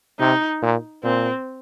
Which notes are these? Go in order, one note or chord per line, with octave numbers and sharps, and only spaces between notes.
C3 D#4
A#2
A#2 C4